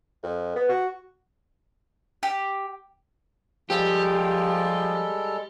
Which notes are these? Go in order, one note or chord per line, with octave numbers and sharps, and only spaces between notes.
F2
B3
F#4
G4
F3 G3 G#3 G4 A4